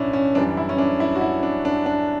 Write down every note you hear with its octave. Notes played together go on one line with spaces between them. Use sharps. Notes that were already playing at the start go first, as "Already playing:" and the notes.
Already playing: B1 A2 C#4 D4 E4
C#4
F#2 E3 G3 D4
E4
C#4
D4
E4
F#4
E4
D4
D4
D4